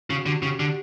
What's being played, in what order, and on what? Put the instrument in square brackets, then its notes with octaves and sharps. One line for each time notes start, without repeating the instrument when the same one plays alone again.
[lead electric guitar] C#3 [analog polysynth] F#4
[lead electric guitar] D3 [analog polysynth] G4
[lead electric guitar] C#3
D3